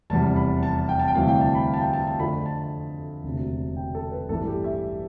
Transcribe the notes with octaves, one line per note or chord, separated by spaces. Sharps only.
F1 E2 C3 G3 A5
B5
A5
G5
A5
G5
D2 C3 E3 G3 F5
G5
A5
B5
F5
A5
G5
A5
A5
F2 D3 F3 A3 B5
A5
E1 D2 C3
G5
A4
B4
A1 G2 E3 G3 A4
G4
E5